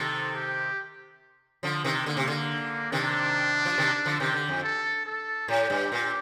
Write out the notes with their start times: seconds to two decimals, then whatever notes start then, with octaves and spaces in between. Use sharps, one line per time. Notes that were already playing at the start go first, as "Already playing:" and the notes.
Already playing: C3 D#3 A4
0.35 G4
1.63 D3 F3
1.84 C3 D#3
2.06 D3 A#3
2.17 C3
2.28 D3
2.92 C3 D#3 D4
3.65 F3
3.78 C3 D#3
4.06 D3 F3
4.20 C3 D#3 G4
4.34 D3
4.48 F2
4.63 A4
5.06 A4
5.48 A2 G4
5.70 G2
5.92 A#2